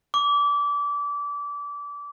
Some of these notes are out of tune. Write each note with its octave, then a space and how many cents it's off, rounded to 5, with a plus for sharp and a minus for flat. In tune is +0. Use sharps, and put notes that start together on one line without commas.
D6 -25